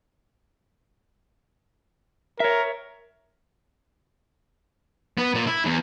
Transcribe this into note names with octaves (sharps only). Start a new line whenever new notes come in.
A#4 C#5 E5
B3
A#2
E4
E2